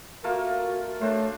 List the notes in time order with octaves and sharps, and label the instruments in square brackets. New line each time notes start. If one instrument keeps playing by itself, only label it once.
[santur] A3 A#3 F4 [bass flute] F#4 [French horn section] A#4
[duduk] A3 [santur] D4 F#4 C5 [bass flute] C#5